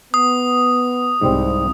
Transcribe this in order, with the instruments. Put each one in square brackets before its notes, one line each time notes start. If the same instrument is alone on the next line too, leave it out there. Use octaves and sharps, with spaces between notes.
[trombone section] B3 [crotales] D#6
[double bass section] C2 [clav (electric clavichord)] G#2 G3 C4